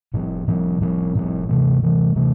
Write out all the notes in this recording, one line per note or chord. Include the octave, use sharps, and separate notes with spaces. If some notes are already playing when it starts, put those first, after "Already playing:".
A2 F3 C4
A2 F3 C4
A2 F3 C4
A2 F3 C4
C3 E3 A3
C3 E3 A3
C3 E3 A3